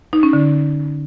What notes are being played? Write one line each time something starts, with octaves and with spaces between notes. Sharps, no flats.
D#4
C#4
D3